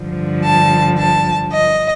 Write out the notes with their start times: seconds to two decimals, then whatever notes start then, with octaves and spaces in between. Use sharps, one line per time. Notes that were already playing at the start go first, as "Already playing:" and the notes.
Already playing: G2 D3 F3
0.43 A5
0.97 A5
1.52 D#5